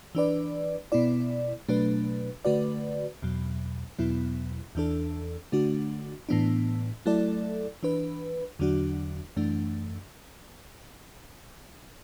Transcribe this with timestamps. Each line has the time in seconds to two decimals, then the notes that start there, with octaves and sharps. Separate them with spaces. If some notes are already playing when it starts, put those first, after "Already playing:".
0.15 E3 D4 B4 D5
0.92 B2 B3 E4 D5
1.69 B2 F#3 A3 D4 B4
2.45 D3 A3 F#4 B4 D5
3.22 E2 B2 F#3
3.99 E2 B2 F#3 B3 E4
4.75 E2 E3 D4 A4
5.52 D3 A3 D4 F#4
6.29 A2 E3 B3 D4
7.06 F#3 A3 E4 A4 D5
7.83 E3 D4 B4
8.59 E2 D3 F#3 D4 F#4
9.37 F#2 E3 A3 D4